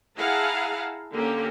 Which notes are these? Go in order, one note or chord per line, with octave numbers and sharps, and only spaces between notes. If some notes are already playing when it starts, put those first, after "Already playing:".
E4 G#4 F5 F#5 A5 A#5
D3 A#3 C#4 G4